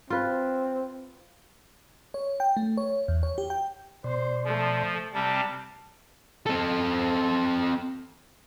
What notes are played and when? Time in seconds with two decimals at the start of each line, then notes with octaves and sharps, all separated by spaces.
0.10 C4 F4 B4
2.14 C#5
2.40 G5
2.57 A3
2.77 C#5
3.08 E2
3.23 C#5
3.38 G4
3.50 G5
4.04 B2 C5 D5 C6
4.45 F3 A3
5.14 C3 G3 C4 A5 A#5
6.46 C4 A4